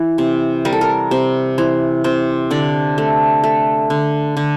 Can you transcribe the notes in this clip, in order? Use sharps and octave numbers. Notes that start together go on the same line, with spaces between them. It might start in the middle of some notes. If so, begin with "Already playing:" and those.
Already playing: E3
C3
G3 A#4
A4
A#4
C3 C5
E3 C5
C3 C5
D3 D5
A3
A3
D3
D3